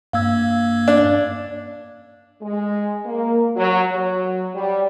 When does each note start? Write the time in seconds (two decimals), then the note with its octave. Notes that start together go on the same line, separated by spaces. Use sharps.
0.13 G2 A#3 F5 E6 G#6
0.88 D4
2.42 G#3
3.06 A#3
3.56 F#3
3.91 F#3
4.54 G3